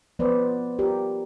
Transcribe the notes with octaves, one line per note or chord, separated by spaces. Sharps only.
F3 B3 B4 C5 D5
F4 G4 A#4 D5